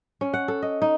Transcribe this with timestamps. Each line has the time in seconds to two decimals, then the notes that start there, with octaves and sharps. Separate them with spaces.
0.21 C#4
0.34 F#5
0.48 A4
0.62 D#5
0.82 D#4